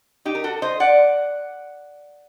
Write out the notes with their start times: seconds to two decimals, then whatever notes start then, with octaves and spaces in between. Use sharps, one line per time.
0.25 D#4 G4
0.35 A#4
0.44 F#4 A4
0.62 C5 D#5
0.80 D5 F#5